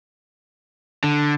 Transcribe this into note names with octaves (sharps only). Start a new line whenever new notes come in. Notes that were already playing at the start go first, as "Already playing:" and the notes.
D3